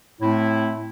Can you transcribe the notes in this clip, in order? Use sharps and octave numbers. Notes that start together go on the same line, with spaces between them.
A2 A3 C4 E4